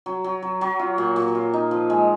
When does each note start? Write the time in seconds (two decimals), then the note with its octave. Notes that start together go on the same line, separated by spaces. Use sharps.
0.06 F#3
0.24 F#3
0.43 F#3
0.61 F#3
0.80 F4
0.98 A#2
1.16 A#2
1.35 F4
1.54 D#4
1.71 F3
1.90 G#3